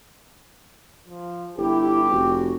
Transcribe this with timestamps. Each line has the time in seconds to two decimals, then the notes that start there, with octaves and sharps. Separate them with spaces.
1.07 F3
1.57 G1 E4 G4
2.11 F1 F#4